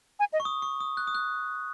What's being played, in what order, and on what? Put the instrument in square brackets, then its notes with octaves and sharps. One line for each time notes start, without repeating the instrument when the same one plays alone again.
[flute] G#5
D#5
[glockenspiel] C#6
D#6
C#6
D#6
F#6
D#6
F#6